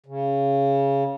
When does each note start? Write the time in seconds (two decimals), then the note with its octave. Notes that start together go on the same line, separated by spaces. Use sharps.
0.06 C#3